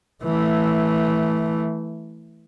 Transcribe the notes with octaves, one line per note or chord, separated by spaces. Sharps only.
E3 A3